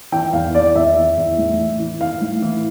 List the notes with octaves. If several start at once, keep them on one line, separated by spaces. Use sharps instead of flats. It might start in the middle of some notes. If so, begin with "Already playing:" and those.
E3 G5
E2 F5
E3 D5
E2 E5
E3
E2
A2
E3
E3
E3 F5
A2
E3